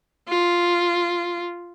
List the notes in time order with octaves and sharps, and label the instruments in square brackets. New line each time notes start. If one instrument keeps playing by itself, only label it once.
[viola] F4